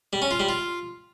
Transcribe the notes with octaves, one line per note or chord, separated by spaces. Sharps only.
G3
C#4
F4
G3
F4